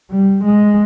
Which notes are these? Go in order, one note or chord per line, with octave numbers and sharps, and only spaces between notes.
G3
G#3